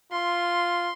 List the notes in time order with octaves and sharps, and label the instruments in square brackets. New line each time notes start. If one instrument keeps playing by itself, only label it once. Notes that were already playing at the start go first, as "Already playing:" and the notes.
[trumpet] F4 [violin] C6